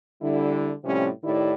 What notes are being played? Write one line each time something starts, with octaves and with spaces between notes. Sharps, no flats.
D3 G3 E4
A2 C3 F3 G3 C4 C#4
A2 D#3 E4 G4 D5